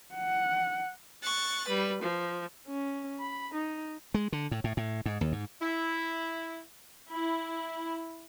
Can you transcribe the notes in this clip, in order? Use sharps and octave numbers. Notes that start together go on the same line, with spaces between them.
F#5
C#6 F#6 A6
G3 B4
F3
C#4
B5
D#4
G#3
D3
A2
A2
A2
G#2
D#2
G#2
E4
E4